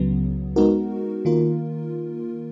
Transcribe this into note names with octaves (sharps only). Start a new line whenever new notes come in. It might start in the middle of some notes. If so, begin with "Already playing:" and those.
Already playing: C#2 C#3 F#3 B3
G#3 B3 D#4 F#4 A#4
D#3 A#3 F4 A#4